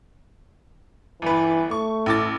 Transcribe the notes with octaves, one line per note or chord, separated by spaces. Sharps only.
G1 E3 B4
A3 C#6
A1 D6 A6